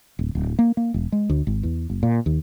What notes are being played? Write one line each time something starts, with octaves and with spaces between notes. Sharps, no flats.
D1
D1
A#3
A#3
E1
G#3
D2
G#1
E2
F#1
A#2
D#2